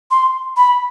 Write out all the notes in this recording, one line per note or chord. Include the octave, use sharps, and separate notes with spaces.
C6
B5